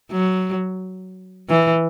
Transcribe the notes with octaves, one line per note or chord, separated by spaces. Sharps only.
F#3
E3